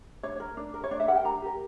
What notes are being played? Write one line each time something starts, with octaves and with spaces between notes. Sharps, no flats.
D4 C#5
A#4
D4
A#4
C#5
D4 D5
E5
G4 A#4 F#5 G5
D4 A#5
G4 A#4